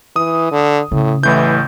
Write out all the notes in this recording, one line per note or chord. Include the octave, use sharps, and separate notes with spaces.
E3 D#6
D3
A2 C#3
A1 A2 E3 G6